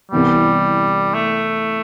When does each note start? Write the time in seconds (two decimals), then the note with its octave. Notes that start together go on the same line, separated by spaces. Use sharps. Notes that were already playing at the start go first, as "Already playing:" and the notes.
0.12 C2 C3 E3 G3 B3
1.14 A3